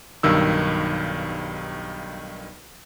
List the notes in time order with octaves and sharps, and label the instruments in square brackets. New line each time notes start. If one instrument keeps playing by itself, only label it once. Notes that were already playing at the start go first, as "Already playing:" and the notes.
[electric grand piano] B1 G2 D#3 E6